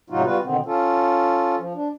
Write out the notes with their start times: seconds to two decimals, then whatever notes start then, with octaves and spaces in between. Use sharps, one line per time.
0.10 A2 C3 F#3 D#4 F4 F#4
0.25 G3 B3 F4 F#4 B4
0.43 B2 D3 D#3 B3 C4
0.66 C#4 F4 A4
1.59 F3
1.74 D4